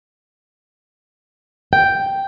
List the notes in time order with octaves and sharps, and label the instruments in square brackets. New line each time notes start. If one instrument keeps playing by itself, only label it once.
[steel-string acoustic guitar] G5